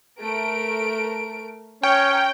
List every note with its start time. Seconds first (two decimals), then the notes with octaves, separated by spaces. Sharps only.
0.20 A3 A#4 D7
1.83 C#4 C#5 G5 A#5